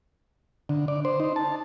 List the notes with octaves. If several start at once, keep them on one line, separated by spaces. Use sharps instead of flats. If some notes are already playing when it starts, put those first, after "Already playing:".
D3
D5
C5
D#4
A5